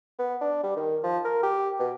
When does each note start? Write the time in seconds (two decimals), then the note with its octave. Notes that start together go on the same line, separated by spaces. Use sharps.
0.19 B3
0.41 D4
0.64 G3
0.76 D#3
1.03 F3
1.25 A#4
1.43 G4
1.79 B2